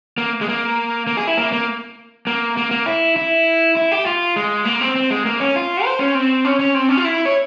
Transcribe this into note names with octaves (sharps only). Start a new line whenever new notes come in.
A#3
G#3
A#3
A#3
G#4
E4
A#3
A#3
A#3
A#3
A#3
E4
E4
E4
G4
F4
G#3
A#3
C4
C4
G#3
A#3
C#4
F4
C5
C#4
C4
C#4
C#4
C4
C#4
F4
E4
C#5